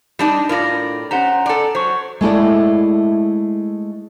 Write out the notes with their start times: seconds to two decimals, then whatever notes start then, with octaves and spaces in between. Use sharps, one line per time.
0.19 G3 D4 D#4
0.49 A2 F4 A#4 D5 A#6
1.11 C#4 G4 C5 F#5 A#5
1.46 A4 D5
1.75 F#3 C5 C#6
2.21 G#3 A3 E4 D5